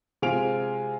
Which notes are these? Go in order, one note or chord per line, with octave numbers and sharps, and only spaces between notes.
C3 G#3 F4 G#5 D7 F7